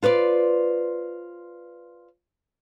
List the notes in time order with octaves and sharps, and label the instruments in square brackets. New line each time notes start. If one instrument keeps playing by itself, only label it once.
[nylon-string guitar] F4 B4 C5 D5